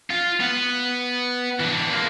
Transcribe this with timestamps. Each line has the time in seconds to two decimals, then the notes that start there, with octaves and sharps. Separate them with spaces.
0.11 F4
0.40 B3
1.60 E3 D4
1.91 G#3 A#3